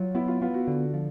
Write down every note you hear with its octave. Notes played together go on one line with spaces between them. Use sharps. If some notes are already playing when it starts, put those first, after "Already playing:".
Already playing: F#3 F4
B3 E4
F4
B3 F4
F#4
D3
F3